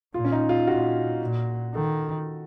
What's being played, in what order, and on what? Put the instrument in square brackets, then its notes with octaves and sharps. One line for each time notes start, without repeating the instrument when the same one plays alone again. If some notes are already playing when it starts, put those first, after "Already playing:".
[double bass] A#2 [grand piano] F4
[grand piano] C#4
D#4
F4
[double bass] A#2 [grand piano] F#4
[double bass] A#2
[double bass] D#3 [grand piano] A4